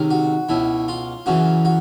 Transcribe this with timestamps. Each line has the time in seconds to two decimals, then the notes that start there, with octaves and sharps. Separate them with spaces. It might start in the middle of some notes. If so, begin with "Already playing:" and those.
Already playing: C#2 C3 D#3
0.11 F#4
0.49 C#2 B2 E4
0.88 F4
1.26 F#2 C#3 E3 F#4
1.65 F#4